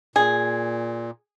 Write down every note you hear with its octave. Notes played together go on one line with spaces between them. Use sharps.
A#2 G#4